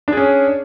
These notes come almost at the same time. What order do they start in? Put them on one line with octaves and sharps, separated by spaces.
D4 G#4 C#4